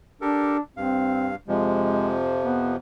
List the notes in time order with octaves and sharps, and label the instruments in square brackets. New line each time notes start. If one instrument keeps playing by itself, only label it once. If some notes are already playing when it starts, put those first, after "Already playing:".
[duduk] D4 [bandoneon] G4 A4 A#4
[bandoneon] G2 F5 [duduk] C4
[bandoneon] F2 C3 F3 [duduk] G#3
[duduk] B3